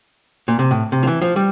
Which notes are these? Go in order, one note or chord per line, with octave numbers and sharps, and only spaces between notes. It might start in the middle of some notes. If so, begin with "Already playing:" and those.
A#2
C3
A2
C3
F3
E3
F3
G3